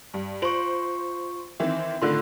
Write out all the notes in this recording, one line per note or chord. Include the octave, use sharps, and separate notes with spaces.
G2
F4 C5 C#6 D7 F#7
D#3 E3 C4 E5
A2 D3 D#3 F4 A4 C6